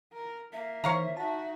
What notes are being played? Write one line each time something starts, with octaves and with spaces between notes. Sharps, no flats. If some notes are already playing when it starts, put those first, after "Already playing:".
A#4
A#3 E5
D#3 E3 C5 C#5 F5 A#5
D#4 F#4 A5